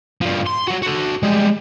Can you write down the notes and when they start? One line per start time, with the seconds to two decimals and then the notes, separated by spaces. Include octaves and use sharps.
0.22 G2 F3
0.46 C6
0.68 F#3 F#4
0.82 F#4 A4
1.23 G3 G#3